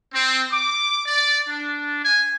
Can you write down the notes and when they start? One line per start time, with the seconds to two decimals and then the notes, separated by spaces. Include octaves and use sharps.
0.12 C4
0.52 D6
1.06 D5
1.48 D4
2.04 G#5